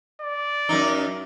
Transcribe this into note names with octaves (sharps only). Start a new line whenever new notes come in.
D5
F#2 A2 D#4